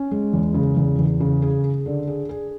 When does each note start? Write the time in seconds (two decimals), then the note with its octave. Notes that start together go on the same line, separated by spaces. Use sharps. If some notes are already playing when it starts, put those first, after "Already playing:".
Already playing: C#4
0.11 G#3
0.33 E2
0.54 C#3
0.77 E2
0.98 E2
1.20 C#3
1.42 G#4
1.64 G#4
1.86 D3
2.07 G#4
2.29 G#4